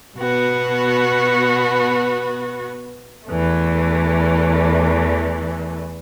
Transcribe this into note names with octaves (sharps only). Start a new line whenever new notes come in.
B2 B3 F#4
E2 E3 A3